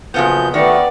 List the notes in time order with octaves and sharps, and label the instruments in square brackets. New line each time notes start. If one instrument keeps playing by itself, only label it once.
[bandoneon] F#2 F3 G6 [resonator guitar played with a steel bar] A#2 C#3 B3
[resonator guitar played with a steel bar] D#3 [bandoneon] A3 F#4 [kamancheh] B3 D5